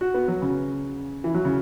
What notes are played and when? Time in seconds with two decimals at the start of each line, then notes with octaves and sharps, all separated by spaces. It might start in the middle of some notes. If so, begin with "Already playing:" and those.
0.01 F#4
0.14 B3
0.28 F#3
0.42 C#3
1.24 E3
1.34 F#3
1.45 C#3